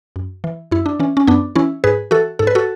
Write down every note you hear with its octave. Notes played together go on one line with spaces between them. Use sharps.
F#2
E3
F#2 E4
D4
E3 C#4
C#4
F#2 B3 D4
E3 C#4 E4
G#2 G#4 B4
E3 F#4 A4
G#2 A4
B4
F#4 A4